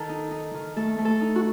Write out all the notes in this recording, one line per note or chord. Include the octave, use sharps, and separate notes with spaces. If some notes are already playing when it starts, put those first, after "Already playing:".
Already playing: D#3 A4
D#4
D#4
D#3
A3 A4
A3
A4
D#4
F#4